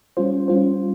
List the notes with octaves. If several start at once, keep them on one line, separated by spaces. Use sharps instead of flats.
G3 C#4 F4 C5
G3 C#4 F4 C5